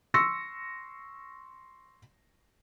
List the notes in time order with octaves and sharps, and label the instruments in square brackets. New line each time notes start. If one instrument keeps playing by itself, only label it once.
[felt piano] C6 C#6 E6 A#6 C#7